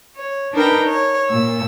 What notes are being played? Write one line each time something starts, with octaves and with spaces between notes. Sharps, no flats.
C#5
D4 D#4 A#4 B4 G5
C#5
A#2 E6